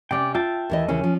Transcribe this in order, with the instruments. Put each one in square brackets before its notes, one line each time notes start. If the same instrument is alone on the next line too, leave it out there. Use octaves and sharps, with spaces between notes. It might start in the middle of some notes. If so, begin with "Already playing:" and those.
[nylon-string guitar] C3 C#4 [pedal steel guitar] D5 G5
[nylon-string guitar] F4 [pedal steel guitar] E5 G5 A5
[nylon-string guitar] D#2 E3 D#5
[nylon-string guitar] D#2 C#3 E3 [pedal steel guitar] C#4
[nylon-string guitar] F3